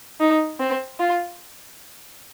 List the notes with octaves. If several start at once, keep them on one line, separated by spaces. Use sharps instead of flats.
D#4
C4
F4